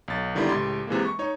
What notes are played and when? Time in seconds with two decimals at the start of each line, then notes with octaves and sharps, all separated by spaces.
0.08 B1 A6
0.35 D3 D#3 G3 B3 E4
0.48 C#2 A2 G4 C6 G#6 A6
0.87 C3 E3 G#3 A#3
1.06 C#6
1.19 D#4 C#5